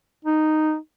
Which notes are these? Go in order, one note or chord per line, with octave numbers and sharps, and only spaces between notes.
D#4